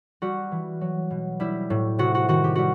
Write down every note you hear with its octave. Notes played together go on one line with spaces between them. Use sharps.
G3 F#4
E3
F#3
B2
G3 E4
A2
C3 F#4
F#4
D#3 F#4
G4
G3 F#4